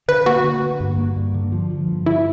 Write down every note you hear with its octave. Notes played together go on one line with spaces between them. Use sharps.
D3 B4
A#3 F#4
D3
A#3
G2
A#3
G2
D3
F3
F3
G2
D3 E4